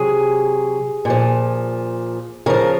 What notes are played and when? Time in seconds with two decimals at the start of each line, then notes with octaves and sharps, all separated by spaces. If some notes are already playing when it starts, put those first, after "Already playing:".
Already playing: C3 F#3 G#4
1.05 A#2 F3
2.46 C#3 F3 A#4